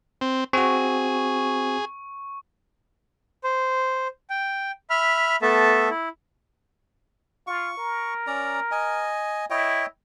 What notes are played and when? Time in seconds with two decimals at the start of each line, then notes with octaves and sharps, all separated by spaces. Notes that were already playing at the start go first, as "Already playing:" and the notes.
0.21 C4
0.53 C4 F#4 G#4 C#6
3.44 C5
4.30 G5
4.90 E5 B5 F6
5.42 A3 B3 A4 E5 A5
5.90 E4
7.47 F4 C#6
7.78 A#4
8.27 C#4 D5 A#5
8.71 D#5 G#5
9.50 E4 C#5 D#5 G5